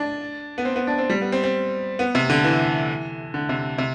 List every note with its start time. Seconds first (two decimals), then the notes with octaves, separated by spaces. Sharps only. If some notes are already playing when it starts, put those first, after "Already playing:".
Already playing: D4
0.58 B3
0.65 C4
0.76 B3
0.87 D4
0.98 C4
1.10 G3
1.21 B3
1.32 C4
1.44 C4
1.99 B3
2.15 C3
2.30 D3
2.44 E3
3.34 D3
3.49 C3
3.78 C3